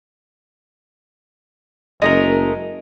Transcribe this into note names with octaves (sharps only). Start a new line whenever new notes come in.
F#1 G#3 A3 A#4 D#5